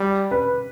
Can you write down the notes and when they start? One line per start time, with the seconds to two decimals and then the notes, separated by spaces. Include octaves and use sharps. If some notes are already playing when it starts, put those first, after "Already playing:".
Already playing: G3
0.31 B4